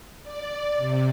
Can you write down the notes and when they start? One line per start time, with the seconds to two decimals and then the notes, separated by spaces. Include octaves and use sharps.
0.23 D5
0.76 C3